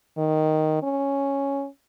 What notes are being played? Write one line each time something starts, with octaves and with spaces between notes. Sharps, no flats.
D#3
C#4